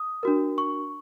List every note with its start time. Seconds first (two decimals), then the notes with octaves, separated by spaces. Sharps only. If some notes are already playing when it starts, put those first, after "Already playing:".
Already playing: D#6
0.23 D4 F#4 A#4
0.58 C#6